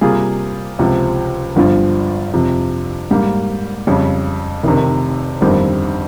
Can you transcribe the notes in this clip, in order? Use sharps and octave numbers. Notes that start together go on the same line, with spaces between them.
C3 G3 A#3 F4 G#4
C#2 C3 F3 C4
G1 G2 F3 C4 F4
F2 C3 F3
G#2 G3 A#3
F2 C#3 G3
F1 F2 C3 D#3
G1 F2 D#3 G3 C4